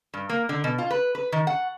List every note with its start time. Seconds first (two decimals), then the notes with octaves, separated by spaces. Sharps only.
0.14 G2
0.29 A#3
0.49 D3
0.64 B2
0.78 F4
0.91 B4
1.15 B4
1.32 D#3
1.47 F#5